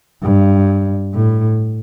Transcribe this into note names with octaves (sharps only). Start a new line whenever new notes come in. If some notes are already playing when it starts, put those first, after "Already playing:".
G2
A2